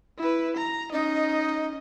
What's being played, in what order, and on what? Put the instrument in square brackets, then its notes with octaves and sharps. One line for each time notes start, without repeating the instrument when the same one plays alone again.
[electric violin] E4 B4
A#5
[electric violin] C#4 D#5 [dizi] D#4